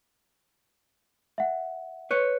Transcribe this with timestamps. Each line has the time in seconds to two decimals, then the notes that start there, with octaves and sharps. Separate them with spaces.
1.38 E5 F#5
2.11 B4 C#5 F#6